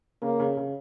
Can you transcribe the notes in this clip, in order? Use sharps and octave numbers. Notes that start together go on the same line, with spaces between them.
C#3 A#3
C#3
C#3